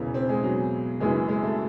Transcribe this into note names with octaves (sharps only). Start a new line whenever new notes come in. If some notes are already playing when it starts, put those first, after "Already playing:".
Already playing: E1 E2 C#3 E3
C4
G#3
F#3
F#1 F#2 E3 G#3
G#3
A3